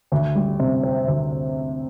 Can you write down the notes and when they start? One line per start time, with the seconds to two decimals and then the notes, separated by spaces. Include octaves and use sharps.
0.12 D2
0.35 G3
0.60 C3
0.83 C4
1.08 D2